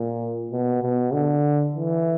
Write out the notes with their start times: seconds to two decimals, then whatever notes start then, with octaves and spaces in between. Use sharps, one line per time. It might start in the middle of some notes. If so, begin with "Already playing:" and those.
Already playing: A#2
0.51 B2
0.82 B2
1.13 D3
1.75 E3